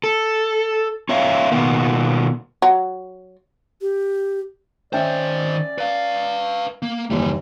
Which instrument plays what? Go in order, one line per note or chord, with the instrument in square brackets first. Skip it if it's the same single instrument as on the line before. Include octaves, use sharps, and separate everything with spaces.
[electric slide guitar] A4
C#4 C#5 E5 F5
B2 D#3 A#3 B3
[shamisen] F#3
[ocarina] G4
[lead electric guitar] D#3 C5 [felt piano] C#4 E5 G5 [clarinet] D5
[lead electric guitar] B4 F5
A#3
[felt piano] F#1 D#2 [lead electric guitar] E3 G3